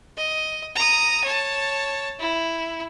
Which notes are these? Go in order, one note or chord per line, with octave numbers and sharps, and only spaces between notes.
D#5
A#5 D#6
C#5 A5
E4